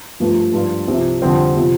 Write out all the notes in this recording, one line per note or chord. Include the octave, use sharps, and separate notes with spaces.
G2 F3 A3
G2 F3 D4 F4
C2 C3 F3
F2 D3 G3 C4
C3 F3